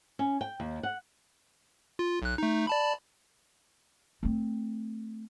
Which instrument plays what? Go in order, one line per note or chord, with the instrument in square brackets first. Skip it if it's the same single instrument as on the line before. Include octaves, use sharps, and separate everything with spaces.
[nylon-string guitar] C#4
G5
D#2
F#5
[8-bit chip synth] F4
B1 F#6
A3 D#4
D5 A5 B5
[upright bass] A3 C4